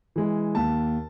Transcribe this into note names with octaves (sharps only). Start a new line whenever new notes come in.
E3 G#3
D#2 A5